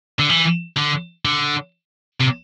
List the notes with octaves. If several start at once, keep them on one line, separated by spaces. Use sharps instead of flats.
D3
E3
D3
D3
C3